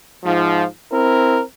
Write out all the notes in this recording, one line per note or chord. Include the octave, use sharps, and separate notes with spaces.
G#2 F3
C4 E4 A#4